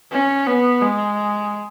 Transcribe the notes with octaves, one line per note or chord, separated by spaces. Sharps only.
C#4
B3
G#3